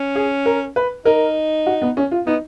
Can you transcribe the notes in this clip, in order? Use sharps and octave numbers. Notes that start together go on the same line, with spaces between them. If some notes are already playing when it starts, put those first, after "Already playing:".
Already playing: C#4
G#4
A#4
B4
D#4 A#4
F#4
B3
C#4
F4
B3 D#4